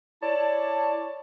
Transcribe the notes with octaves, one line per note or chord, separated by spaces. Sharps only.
E4 C#5 D5 A5